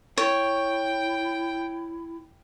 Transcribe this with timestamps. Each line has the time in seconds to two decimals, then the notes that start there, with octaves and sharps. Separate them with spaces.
0.18 E4 C#5 G5